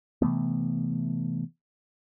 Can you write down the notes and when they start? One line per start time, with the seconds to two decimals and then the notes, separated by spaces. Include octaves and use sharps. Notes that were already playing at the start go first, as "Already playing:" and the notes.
0.22 C3 E3 A3 B3